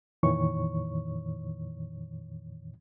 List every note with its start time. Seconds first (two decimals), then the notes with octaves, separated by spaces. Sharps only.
0.23 F2 A#2 D#3 E3 C#5 C#6